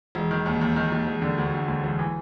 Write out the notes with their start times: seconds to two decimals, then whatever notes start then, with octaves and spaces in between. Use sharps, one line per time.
0.15 E1
0.31 D#3
0.46 D#2
0.61 D#2
0.76 D#3
0.92 D#2
1.06 E1
1.22 D3
1.38 D2
1.54 D2
1.68 D2
1.84 E1
1.99 E3